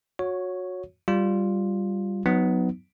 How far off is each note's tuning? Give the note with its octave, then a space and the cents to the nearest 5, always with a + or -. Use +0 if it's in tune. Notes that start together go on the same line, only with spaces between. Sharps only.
F#4 -25 C#5 +0
G3 +0 F4 +0
F#3 -10 B3 +15 D#4 +0